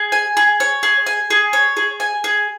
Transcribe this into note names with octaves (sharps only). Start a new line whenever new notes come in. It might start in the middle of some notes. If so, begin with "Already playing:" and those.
Already playing: G#4
G#5
G#4
C#5
G#4
G#5
G#4
C#5
G#4
G#5
G#4